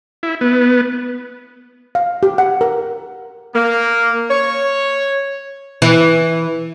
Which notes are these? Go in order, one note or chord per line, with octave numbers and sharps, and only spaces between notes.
E4
B3
F5
G4
F#5
A#4
A#3
C#5
E3